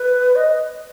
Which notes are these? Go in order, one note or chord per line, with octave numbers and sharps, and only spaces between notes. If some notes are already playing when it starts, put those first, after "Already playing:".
Already playing: B4
D#5